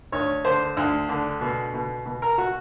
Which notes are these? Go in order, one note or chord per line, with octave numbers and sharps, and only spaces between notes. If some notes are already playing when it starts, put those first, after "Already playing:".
D2 C#5
D3 C5
D2
D3
B2
B2
B2
A#4
F#4